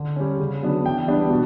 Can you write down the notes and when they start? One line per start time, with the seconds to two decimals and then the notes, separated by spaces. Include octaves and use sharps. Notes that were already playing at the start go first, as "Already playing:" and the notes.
Already playing: D3
0.16 G3 C#4
0.40 C#3
0.63 F#3 B3 D4
0.86 E3 G5
1.08 G3 B3 D4
1.30 B2